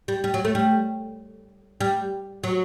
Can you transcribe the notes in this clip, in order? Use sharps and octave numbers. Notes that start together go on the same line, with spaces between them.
G3
G3
F#3
A3
G3
G3
F#3